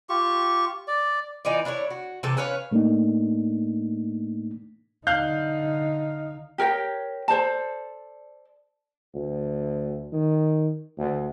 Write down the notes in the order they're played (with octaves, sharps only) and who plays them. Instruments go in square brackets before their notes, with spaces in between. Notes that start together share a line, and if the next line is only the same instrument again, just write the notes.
[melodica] F4 G4 C#6
D5
[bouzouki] E3 D#4 F4 D5
D4 E4 B4 C#5
F#4
C3 E3 G4 A4
C#4 B4 C#5 F5
[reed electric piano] A2 A3 A#3 D4 D#4
[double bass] D3 D#4 [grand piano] F5 F#6 G6
[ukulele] G4 A#4 C#5 G5
A4 C5 D5 A5
[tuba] D2
D#3
D2